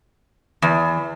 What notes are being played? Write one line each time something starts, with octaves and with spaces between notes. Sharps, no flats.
E2